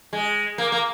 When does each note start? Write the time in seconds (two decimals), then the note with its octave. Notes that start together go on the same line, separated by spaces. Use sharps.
0.13 G#3
0.58 A#3
0.72 A#3